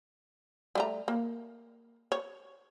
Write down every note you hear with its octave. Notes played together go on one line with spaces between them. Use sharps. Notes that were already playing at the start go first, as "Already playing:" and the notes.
G3 A3 A#5
A#3
C#5